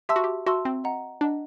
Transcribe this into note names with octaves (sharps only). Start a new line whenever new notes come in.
G4 E5 A5 C6 E6
F#4
G4
F#4 E5 A5 C6 E6
C4
D#5 F#5 A#5
D4 D#5 F#5 A#5